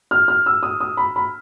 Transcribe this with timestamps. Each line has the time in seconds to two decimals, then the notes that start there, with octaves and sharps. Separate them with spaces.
0.11 F6
0.28 F6
0.46 E6
0.63 D#6
0.81 D#6
0.97 B5
1.16 B5